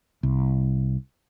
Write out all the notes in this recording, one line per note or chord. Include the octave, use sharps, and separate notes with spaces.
C2